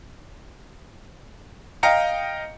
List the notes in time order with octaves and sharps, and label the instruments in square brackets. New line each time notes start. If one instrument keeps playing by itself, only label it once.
[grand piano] D#5 F5 G5 A#5 C#7